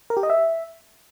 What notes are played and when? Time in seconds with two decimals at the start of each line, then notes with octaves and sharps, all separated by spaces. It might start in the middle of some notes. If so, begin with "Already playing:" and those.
0.10 A#4
0.17 G4
0.23 D#5
0.30 E5